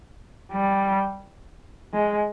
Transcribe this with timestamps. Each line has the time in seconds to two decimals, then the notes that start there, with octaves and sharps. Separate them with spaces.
0.52 G3
1.94 G#3